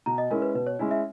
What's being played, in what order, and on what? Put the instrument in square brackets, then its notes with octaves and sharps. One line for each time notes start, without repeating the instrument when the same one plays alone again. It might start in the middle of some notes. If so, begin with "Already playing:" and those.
[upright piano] B2 [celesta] A#5
[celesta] D#5
[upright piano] G#3 C#4 E4 [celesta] A#4
[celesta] B4
[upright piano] B2 [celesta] B4
[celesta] C#5
[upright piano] G#3 C#4 E4
[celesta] E5